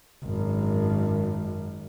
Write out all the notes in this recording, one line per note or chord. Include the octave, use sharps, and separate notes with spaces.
G#1 F#2